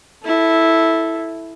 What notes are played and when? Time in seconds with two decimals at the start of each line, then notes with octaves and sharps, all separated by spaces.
0.24 E4 A4